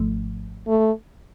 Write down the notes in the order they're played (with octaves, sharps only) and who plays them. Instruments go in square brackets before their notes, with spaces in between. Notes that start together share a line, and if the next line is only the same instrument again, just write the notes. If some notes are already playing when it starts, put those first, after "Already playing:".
Already playing: [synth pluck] G#1 G#2 F3 A3
[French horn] A3